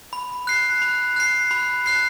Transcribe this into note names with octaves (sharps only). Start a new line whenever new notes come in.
B5
F#6 C7
B5
F#6 C7
B5
F#6 C7